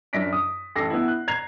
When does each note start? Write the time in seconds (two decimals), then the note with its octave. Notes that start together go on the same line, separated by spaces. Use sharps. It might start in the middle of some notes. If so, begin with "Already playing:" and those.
0.13 F#2 D4 A#6 B6 D7
0.33 D#6
0.76 A1 A4 D6 A#6 C7
0.90 B3 E4
1.08 F#6
1.28 A#5 G#6 C7 F7